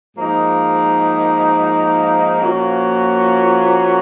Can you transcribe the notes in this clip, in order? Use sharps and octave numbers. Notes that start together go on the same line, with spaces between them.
G#2 F3 A#3 D#4
A#2 F3 A#3 C#4 F#4